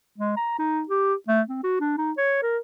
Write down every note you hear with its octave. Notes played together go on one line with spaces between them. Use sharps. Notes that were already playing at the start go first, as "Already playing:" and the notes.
G#3
A#5
D#4
G4
A3
C4
F#4
D4
D#4
C#5
A#4